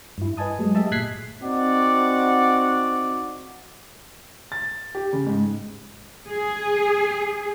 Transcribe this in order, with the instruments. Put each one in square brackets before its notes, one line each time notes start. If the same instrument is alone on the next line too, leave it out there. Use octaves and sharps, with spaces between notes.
[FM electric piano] G2 E4
B4 D#5 G#5 A5 D#6
F#3 G#3 A3
G4 G#4 D#5 E5 A5
G1 A#2 F#6 G#6 B6 C7
[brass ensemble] C4 D#4 F#4 D5 F#5
[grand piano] A6
G4
C#3
G#2
[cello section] G#4